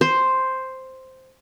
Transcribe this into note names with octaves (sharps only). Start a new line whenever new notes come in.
C5